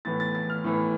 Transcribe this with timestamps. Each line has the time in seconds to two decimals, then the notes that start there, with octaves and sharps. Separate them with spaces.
0.05 A2 E3 B3 A6
0.20 A6
0.35 A6
0.50 F6
0.64 A2 E3 B3